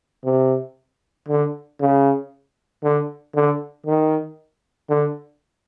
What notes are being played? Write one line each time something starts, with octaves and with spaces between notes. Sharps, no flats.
C3
D3
C#3
D3
D3
D#3
D3